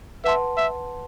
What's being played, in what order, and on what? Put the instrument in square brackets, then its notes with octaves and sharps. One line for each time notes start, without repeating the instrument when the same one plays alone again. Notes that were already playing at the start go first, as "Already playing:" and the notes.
[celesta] B4 F#5 A5 C6 [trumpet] E5
[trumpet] E5